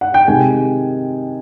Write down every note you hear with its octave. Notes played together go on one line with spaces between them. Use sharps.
F#5
G5
C3 D#3 G#3 G#5